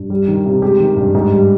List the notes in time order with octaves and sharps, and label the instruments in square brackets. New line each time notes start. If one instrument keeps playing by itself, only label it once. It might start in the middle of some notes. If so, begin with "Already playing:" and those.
Already playing: [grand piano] G2
G3
D#3
C3
G#3 G4
D#3
G2
G#2
G3